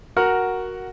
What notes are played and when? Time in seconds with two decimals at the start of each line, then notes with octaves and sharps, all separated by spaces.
0.16 F#4 A#4 F#5 F6